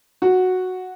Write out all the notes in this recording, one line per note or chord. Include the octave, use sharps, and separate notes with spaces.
F#4